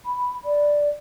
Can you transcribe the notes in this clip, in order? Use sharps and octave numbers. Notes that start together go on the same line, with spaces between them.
B5
D5